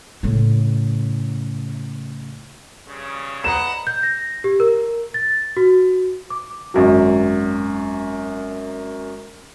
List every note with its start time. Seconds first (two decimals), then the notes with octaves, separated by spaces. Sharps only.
0.23 A2 C#3
2.88 G2 C#3
3.44 B4 D5 D#5 F#5 A#5 E7
3.87 G6
4.03 A#6
4.44 G4
4.60 A#4
5.14 A6
5.57 F#4
6.30 D6
6.74 G#1 F#2 F#3